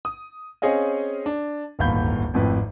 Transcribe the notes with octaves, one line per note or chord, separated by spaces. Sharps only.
D#6
C4 C#4 G#4 C#5 D#5 F5
D4
D1 G1 D#2 F5 B5 G6
G#1 F2 A2 B4